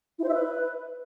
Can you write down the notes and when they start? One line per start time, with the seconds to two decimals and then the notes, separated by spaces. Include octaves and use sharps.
0.19 E4
0.24 C5
0.29 E5
0.34 B4